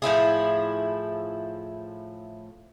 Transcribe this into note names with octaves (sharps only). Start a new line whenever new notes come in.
A2 F3 E4 G#4